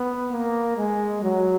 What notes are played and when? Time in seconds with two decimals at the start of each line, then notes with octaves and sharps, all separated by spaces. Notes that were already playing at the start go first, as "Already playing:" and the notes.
Already playing: B3
0.31 A#3
0.77 G#3
1.23 F#3